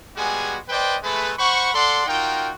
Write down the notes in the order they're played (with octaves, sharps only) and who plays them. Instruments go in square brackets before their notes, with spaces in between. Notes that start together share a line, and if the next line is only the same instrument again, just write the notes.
[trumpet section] G3 G#3 B3 F#4 G#4 G#5
B4 C5 D5 D#5 G5
G#3 A3 B4
C5 F#5 B5 C#6
A4 D5 F#5 C6
D#4 F4 F#4 A#4 G5